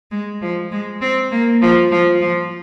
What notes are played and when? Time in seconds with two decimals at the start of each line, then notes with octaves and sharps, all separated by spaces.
0.11 G#3
0.42 F3
0.72 G#3
1.01 C4
1.32 A#3
1.62 F3
1.92 F3
2.21 F3